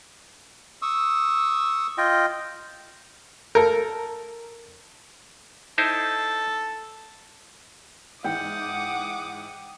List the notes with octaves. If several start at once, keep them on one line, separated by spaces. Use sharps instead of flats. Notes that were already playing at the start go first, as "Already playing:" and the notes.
C#6 D#6 E6
F4 D#5 G5
A4 A#4
D#4 E4 A4 C5
G#2 E3 F#5 G5 D6 D#6